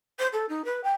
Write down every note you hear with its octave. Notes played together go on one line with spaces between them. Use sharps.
C5
A4
D#4
B4
G5